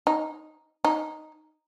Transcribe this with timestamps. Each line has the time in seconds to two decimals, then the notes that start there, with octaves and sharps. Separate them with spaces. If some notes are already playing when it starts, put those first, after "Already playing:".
0.07 D#4
0.85 D#4